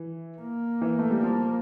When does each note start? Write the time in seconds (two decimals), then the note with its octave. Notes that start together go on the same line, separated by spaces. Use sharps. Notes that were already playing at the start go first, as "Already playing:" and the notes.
Already playing: E3
0.41 A#3
0.82 E3
0.99 A3
1.10 G3
1.23 F3